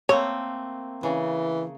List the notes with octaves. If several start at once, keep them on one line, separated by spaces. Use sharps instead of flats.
A3 A#3 C4 C#5
C#3 E3